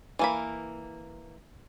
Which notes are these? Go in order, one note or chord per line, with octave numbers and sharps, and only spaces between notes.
E3 A#3 B5